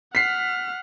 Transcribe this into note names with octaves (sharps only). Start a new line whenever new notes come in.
F#5 F6 B6 C7